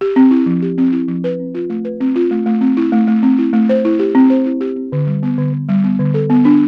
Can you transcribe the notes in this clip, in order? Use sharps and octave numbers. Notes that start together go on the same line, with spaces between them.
G4
C4
E4
F3
G4
C4
E4
F3
B4
C4
F4
A3
B4
C4
F4
A3
A3
C4
E4
A3
A3
C4
E4
A3
C5
E4
G4
C4
C5
E4
G4
C4
D3
G3
B3
D3
D3
G3
B3
D3
A4
B3
D4